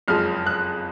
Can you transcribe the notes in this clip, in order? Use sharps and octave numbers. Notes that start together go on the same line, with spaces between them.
F#1 F2 F3 G#3 F6
F#6